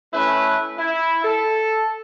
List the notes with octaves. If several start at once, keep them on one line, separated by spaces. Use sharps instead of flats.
A3 C#4 E4 B4
E4
A4